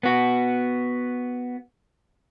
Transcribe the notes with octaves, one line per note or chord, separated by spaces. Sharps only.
B3 F#4